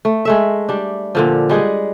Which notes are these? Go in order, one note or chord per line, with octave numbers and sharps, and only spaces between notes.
A3
G#3 A3 E5
G3 D4
A#2 D3 F3
G3 G#3 G#4 F#5